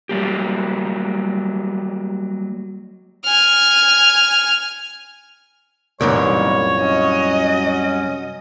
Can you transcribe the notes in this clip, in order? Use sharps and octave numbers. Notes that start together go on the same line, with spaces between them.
F#3 G3 A#3 G4
G#5 F6
C2 F#2 A#2 D#3 E3 G3 C#5
F#3 C#4 D#5